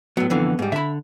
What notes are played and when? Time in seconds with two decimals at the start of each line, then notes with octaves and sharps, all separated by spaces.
0.17 A2 F#3 B3
0.30 F2 D3 E3
0.59 G#2 G3
0.72 D3 E5 B5